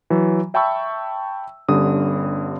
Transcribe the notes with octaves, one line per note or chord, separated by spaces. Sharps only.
E3 F#3
E5 G5 A5 B5 C#6 E6
G1 D3 G3 C#4 D#6